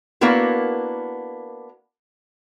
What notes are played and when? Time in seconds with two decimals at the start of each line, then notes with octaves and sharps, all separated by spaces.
0.21 A#3 B3 D4 E4 F#4 A#4